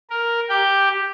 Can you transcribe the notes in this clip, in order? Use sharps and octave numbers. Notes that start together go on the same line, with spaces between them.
A#4
G4 G5